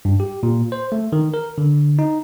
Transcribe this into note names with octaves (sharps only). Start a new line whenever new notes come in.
G2
G4
A#2
C5
A3
D#3
A#4
D3
D#4